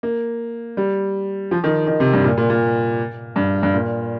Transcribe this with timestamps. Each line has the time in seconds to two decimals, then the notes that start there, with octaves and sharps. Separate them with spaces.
0.03 A#3
0.77 G3
1.51 F3
1.64 D#3
1.87 D#3
2.00 C3
2.13 G2
2.24 A#2
2.37 A#2
2.50 A#2
3.36 G2
3.63 G2
3.74 A#2